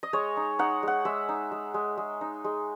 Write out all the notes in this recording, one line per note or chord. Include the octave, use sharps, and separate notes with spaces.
D#5
G#3 C#5
D#4
D#4 F#5
G#3 F#5
G#3 E5
D#4
G#3
G#3
G#3
D#4
G#3